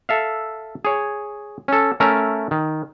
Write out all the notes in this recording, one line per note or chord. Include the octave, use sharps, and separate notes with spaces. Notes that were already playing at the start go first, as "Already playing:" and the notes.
A4 E5 F5
G#4 C#5
C#4 A4
A3 C#4 A#4 E5
D#3